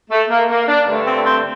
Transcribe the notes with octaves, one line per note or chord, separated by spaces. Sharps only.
A3
A#3
A#3
D4
G2 D3 A3
C4
C4